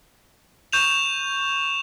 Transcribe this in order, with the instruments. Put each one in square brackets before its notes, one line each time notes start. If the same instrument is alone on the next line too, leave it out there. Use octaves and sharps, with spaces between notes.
[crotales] C#6 G6 E7 F7